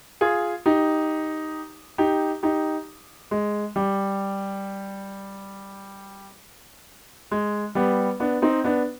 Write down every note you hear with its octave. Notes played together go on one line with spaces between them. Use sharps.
F4 G#4
D#4 G4
D#4 G4
D#4 G4
G#3
G3
G#3
G3 B3
B3 D4
C4 D#4
B3 D4